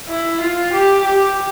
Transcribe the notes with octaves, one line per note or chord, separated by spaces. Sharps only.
E4
F4
G4
G4